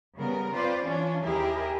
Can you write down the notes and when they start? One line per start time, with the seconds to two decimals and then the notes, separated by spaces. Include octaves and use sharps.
0.18 C#3 G3 B3 A#4
0.53 C4 F4 B4 C5 D5
0.84 E3 C#4 D4 F4
1.22 D#2 E4 G4 G#4 A#4 E5